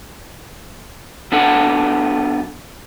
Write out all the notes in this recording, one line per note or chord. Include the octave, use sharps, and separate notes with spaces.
F#3 B3 D4 A4 F#5